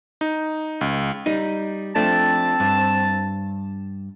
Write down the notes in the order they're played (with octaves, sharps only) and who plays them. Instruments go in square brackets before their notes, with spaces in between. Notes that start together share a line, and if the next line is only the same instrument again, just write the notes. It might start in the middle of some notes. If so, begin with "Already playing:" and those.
[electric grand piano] D#4
C#2
[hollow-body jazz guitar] G3 D#4
[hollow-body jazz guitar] F3 A3 D4 [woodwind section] C4 A5
[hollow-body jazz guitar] G2